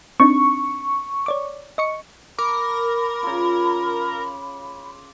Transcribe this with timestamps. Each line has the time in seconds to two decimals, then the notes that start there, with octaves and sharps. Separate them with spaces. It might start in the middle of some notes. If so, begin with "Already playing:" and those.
0.20 C4 D4 D#4 C#6
1.26 C#5 D5 D6
1.78 D#5 C#6 C#7
2.39 A#4 B5 D6
3.23 C#3 F4